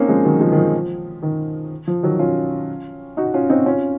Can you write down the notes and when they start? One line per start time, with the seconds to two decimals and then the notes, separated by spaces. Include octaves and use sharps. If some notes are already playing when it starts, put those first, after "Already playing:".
Already playing: A#3 C4 C#4 D#4
0.09 F3 G#3
0.24 D#3 F#3
0.40 F3 G#3
0.52 D#3
0.57 F3
1.22 D#3
1.87 F3
2.03 D#3 F#3
2.19 C#4 F4
3.17 D#4 F#4
3.34 C#4 F4
3.50 C4 D#4
3.66 C#4 F4